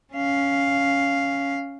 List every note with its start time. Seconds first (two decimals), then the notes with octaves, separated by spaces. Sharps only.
0.13 C#4 F5